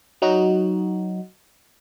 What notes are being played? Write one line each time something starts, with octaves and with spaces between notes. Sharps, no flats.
F#3 D#4 F#4